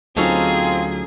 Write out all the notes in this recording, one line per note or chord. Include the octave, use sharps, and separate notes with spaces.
D2 F#3 C4 C#4 D#4 F4 G#4 A4